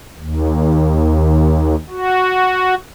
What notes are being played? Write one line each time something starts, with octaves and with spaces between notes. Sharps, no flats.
D#2
F#4